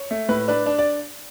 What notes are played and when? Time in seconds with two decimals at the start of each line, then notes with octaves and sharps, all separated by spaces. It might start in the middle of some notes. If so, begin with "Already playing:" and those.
Already playing: C#5
0.11 A3
0.29 A2 B4
0.48 D4 B4
0.66 D4
0.79 D5